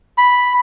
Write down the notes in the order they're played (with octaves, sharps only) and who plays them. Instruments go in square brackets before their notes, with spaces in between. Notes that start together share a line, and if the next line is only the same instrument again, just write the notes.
[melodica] B5